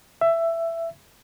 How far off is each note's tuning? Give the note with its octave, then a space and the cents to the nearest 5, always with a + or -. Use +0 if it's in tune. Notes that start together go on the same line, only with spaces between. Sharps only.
E5 +15